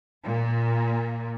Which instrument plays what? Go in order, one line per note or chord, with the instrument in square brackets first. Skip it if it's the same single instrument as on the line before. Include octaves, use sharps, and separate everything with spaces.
[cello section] A#2